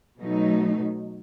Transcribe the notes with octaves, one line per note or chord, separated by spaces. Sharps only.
B2 F#3 A3 D#4